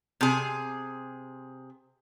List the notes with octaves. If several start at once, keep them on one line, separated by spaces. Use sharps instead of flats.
C3 G#4